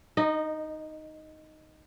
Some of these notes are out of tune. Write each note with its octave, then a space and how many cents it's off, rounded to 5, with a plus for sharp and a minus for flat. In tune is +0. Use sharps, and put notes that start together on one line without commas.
D#4 +0 D#5 -25